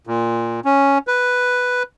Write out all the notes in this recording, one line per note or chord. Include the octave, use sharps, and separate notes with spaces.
A#2
C#4
B4